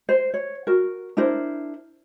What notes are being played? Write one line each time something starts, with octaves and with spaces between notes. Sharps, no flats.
C5
C#5
F#4 A#4
D4 E4 A#4 C5